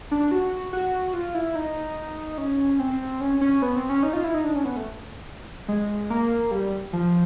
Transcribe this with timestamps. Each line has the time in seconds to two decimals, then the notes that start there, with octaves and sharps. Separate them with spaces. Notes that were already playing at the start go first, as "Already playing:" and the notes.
0.11 D4
0.31 F#4
0.73 F#4
1.13 F4
1.34 E4
1.55 D#4
2.38 C#4
2.79 C4
3.21 C#4
3.41 C#4
3.62 B3
3.76 C4
3.89 C#4
4.03 D#4
4.13 F4
4.24 E4
4.34 D#4
4.44 D4
4.55 C#4
4.65 B3
4.76 A3
5.68 G#3
6.10 A#3
6.51 G3
6.93 F3